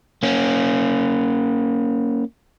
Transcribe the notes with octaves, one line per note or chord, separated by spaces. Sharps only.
A#3 C#4